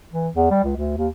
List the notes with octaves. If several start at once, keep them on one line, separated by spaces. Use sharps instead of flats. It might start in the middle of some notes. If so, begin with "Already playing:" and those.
E3
E2
G3
C#2
D2
D#2